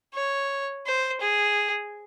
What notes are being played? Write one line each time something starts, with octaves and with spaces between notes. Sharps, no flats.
C#5
C5
G#4